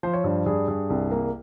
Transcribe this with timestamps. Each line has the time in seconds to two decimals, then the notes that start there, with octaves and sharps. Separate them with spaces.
0.03 F3 C5
0.13 C#5
0.24 G2
0.46 G2 G#4
0.68 G2
0.90 C2
1.11 A#3